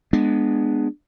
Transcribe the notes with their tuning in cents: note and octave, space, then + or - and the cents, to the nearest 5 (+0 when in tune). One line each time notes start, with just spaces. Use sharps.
G#3 +0 B3 +0 D4 +20